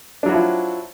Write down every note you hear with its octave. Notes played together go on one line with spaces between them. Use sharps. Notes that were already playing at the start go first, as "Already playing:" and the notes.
F3 F#3 D4 E4 F#4